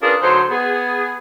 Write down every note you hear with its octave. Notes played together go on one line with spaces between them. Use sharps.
C#4 D4 F4 G#4 A#4 B4
D3 F#3 D#4 C5
B3 G#4